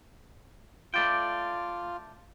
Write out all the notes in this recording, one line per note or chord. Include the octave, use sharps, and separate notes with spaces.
A3 F4 D5 G5